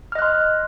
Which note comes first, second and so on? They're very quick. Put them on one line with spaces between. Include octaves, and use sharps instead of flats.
F6 D#5 F#6 C6